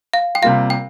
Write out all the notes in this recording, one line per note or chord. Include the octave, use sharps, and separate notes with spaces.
F5
G5
C3 G3 A#3 F4 F5
G5